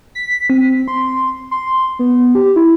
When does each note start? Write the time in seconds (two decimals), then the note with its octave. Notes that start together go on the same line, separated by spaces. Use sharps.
0.15 B6
0.50 C4
0.88 C6
1.51 C6
1.99 B3
2.35 G4
2.56 E4